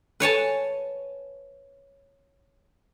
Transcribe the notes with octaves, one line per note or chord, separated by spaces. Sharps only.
B4 C#5 G#5 A5